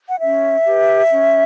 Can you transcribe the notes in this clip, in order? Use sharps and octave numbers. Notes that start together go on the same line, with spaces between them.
F#5
C#4 E5
G4 B4
C#4